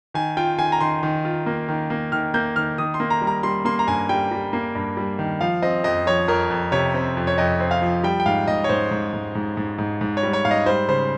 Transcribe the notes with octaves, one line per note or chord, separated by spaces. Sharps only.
D#3 G#5
F4 G5
D#3 G#5
A#5
D#3 C6
D#3
F4
A#3
D#3
A#3
D#3 F6
A#3 G6
D#3 F6
D#3 D#6
C6
A#3
A#5
G3
A#5
G3 C6
A#3 C6
A#5
G2 G#5
G3 G5
G3
A#3
G2
G3
D#3
F3 F5
C4 D#5
F2 D#5
F3 C#5
F2 A#4
F2
C3 C#5
C4
F2
C#5
F2 D#5
C4
F5
F3
G3 G5
G5
G#2 F5
G#2 D#5
C#5
G#2 C5
G#2
G#2
G#2
G#2
G#2
G#2
C#5
G3
C#5
G#2 F5
D#5
G3 C5
C#3 C5